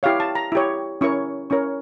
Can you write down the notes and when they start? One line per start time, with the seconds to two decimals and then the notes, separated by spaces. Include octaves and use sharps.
0.03 E4 G4 C#5 F5
0.20 A5
0.35 A#5
0.52 E4 G4 C#5
1.01 C#4 E4 A#4 C#5 C#6
1.50 C#4 E4 A#4 C#5 C#6